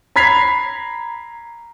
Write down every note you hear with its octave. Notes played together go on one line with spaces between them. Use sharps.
A#5 B5 G#6 B6 C7 F7